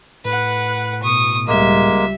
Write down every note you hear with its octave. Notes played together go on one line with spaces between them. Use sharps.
A2 B4 F#5
B2 C#6 D#6
C#2 C#3 G3 G#3 A#3 E5